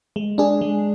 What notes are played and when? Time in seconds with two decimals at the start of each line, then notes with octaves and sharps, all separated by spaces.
0.16 G#3
0.38 D4 G#4
0.61 G#3